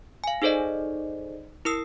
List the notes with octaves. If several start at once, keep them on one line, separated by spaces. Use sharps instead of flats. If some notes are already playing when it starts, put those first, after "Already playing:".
F5 G#5
D#4 G#4 A4 C5 D5 D#5
E4 A#4 D#6 E6 C7